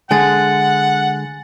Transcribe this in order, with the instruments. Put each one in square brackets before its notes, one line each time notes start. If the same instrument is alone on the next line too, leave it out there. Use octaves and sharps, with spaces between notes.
[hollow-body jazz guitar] D3 G#3 [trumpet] F#5 [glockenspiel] G#5 A6